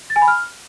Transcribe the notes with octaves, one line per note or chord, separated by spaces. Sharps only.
A6
G#5
B5
F6